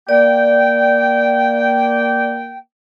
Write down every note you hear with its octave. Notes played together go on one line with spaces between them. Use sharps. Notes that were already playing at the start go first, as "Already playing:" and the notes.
A#3 D5 G5